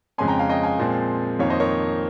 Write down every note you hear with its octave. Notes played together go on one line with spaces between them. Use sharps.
F2 C#3 G#3 C#4 G#5 C6
G5 A#5
F5 G#5
D#5 G5
F5 G#5
A#2 F3 G#3 C4
F2 D#3 A#3 C#5 F5
C5 D#5
A#4 C#5